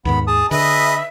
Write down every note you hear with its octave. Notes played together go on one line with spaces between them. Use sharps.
D#2 G#2 D#3 B3 B5
G#4 A5 D#6
D3 G#4 B4 D#5 E5